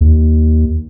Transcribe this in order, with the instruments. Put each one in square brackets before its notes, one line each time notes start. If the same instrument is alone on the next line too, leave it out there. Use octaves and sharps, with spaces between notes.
[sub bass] D#2